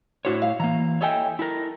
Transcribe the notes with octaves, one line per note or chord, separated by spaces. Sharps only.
A2 D4 E4 F#4 C5 C#5
F5
E3 A#3 A#5
E4 A4 C#5 D#5 G5 G#5
E4 A4 A#4